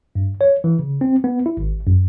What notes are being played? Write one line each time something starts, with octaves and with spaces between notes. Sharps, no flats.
G2
C#5
E3
C#3
C4
B3
E4
G#1
F#2